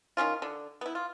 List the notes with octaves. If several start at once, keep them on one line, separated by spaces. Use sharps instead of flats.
D#3 F3 C#4 F4
D3
B3 E4
F4